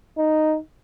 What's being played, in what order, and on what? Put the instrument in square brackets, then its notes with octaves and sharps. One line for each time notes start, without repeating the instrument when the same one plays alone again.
[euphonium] D#4